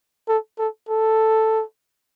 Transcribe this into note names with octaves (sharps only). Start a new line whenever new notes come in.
A4
A4
A4